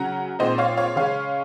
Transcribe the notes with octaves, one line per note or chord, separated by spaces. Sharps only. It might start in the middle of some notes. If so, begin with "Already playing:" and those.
Already playing: C#3 F#3 C#4 F#5 A#5
A#2 G#3 C4 D#4 C5 D#5
C#5 F5
C#5 F5
C#3 G#3 C#4 C#5 F5